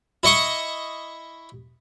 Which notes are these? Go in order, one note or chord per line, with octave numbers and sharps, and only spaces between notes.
E4 D#5 C#6 D#6